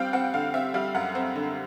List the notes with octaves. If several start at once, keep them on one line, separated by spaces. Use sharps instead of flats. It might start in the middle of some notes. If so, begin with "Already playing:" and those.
Already playing: G3 C4 F5 G5
C4 F#5
D3 F5
C4 E5
G3 F5
F#2 F#5
C4
D3